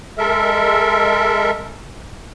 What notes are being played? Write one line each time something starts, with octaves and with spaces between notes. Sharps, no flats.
G#3 A4 A#4 E5